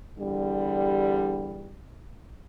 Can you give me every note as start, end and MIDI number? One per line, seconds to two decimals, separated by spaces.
0.19 1.77 40
0.19 1.77 50
0.19 1.77 55